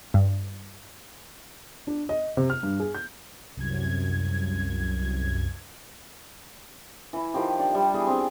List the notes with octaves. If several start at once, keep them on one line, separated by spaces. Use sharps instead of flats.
G2
D4
D#5
C3
F6
G2
G#4
G6
C2 F#2 G#6
E3 E4
D#3 F3 G4
D4 D5
G3 E5
E3 B3 G4 G#4
C4 D4 G#4